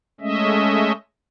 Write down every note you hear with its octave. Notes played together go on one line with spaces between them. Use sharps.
G#3 A3 C#4 D#5 E5